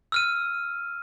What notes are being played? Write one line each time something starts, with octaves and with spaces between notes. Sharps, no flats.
E6 F6 D#7